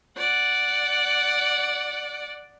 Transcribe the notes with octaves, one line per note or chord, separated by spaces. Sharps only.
D5 F#5